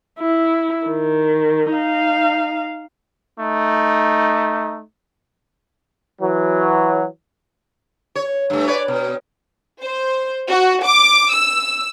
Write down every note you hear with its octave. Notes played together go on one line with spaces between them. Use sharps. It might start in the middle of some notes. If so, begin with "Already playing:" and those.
E4
D#3
D#4 F5
A3 D#4
E3 F#3
C#5
G2 A3
B4 C#5 D5
B2
C5
F#4
D6
E6